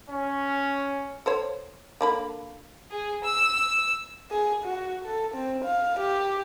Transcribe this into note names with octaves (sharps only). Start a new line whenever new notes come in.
C#4
A4 C5 C#5
D3 A#3 B5
G#4
E6
G#4
F#4
A4
C4
F5
G4